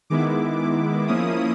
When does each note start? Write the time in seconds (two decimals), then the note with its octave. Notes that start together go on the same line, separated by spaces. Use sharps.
0.10 D#3 G#3 B3 E4 D6
0.58 D6
1.08 F3 A#3 C#4 E4 D#6